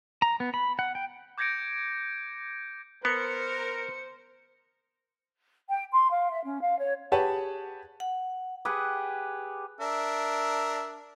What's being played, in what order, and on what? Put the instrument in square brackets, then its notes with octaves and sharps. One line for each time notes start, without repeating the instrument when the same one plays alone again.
[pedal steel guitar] A#5
B3
B5
F#5
G5
[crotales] D6 G6 G#6 A#6 C#7 D7
[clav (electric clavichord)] B3 [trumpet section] A#4 [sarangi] C5 [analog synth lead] C#7
[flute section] G5
C6
F5
E5
C#4
F5
C#5
[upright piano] G4 G#4 B4 C#5 F#5 A5
[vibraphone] F#5
[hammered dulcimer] G4 G#4 B4 F#5
[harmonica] D4 A#4 E5